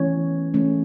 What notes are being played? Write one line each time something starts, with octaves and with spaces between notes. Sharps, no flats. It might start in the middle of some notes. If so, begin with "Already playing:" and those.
Already playing: E3 A3 C#4 C#5
E3 A3 C#4